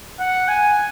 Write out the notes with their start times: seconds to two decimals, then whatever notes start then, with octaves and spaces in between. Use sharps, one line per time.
0.19 F#5
0.48 G#5